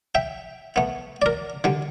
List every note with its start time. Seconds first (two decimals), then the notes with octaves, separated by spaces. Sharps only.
0.15 E5 G5
0.76 A3 B3
1.22 A#4 D5
1.64 D3 G3